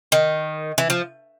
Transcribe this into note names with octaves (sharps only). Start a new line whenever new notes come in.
D#3
E3
F3